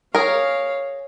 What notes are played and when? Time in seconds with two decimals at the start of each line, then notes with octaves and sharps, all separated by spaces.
0.15 G#4 A#4 C#5 F5